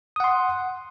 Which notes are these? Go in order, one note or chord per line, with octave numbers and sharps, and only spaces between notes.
F#5 C6 D#6